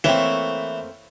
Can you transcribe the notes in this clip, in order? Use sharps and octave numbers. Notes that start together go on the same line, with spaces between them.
E3 A3 A#3 C4 C#5